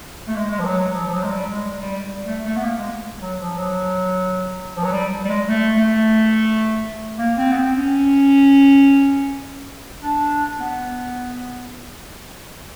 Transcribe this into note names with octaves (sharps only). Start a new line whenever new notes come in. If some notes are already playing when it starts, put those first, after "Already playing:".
A3
G#3
G#3
F3
F#3
F#3
F3
F3
F#3
G#3
G3
G#3
G3
A3
A3
B3
A#3
G#3
F#3
F3
F#3
F3
F#3
G3
G3
G#3
A3
A3
A#3
C4
B3
C4
C#4
D4
B3